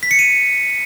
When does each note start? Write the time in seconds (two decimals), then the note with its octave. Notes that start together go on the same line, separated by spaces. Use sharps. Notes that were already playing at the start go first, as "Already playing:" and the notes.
0.03 B6
0.11 C#7
0.19 D#7